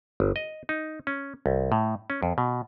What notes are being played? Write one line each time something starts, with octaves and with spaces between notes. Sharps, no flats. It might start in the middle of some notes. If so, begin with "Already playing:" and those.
G1
D#5
D#4
C#4
C2
A2
C#4
F2
B2